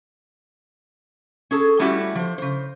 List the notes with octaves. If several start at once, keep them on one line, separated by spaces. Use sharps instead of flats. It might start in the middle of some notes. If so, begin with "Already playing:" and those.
C#4 G#4 A4
G3 A3 C#4 E4 F#4 G4
F3 C5
C#3 C5